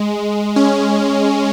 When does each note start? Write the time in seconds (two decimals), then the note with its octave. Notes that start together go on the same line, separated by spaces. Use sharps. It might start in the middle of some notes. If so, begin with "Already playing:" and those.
Already playing: G#3
0.56 C#4